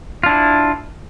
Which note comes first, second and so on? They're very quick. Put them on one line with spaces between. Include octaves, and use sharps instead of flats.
F4 D4 E4